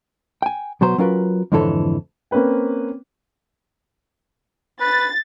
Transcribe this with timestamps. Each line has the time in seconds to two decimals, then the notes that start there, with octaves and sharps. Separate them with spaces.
0.42 G5 G#5
0.81 B2 F#3 B3 C5 A#5
0.98 F#3 C#4 F4 A#4 B4
1.52 F2 G#2 D3 E3 A4 C#5
2.31 A#3 C4 C#4 B4 G5
4.80 B4 A6